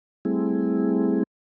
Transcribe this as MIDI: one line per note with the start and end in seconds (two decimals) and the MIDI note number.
0.25 1.23 55
0.25 1.23 57
0.25 1.23 60
0.25 1.23 64
0.25 1.23 68